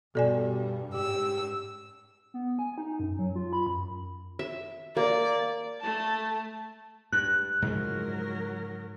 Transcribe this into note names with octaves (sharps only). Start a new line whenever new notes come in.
G2 B2 G3 A4 D5 G#5
G#2 G4 E6
B3
G#5
D#4
F#2
F#3
F4
B5
F#2
E5
A#3 D5
A3 A5
G2 F#6
G#2 C#3 F3 F#3 A#4